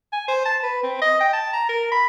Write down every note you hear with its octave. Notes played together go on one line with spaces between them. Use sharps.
G#5
C5
A5
B4
C4
D#5
G5
A5
A#5
A#4
B5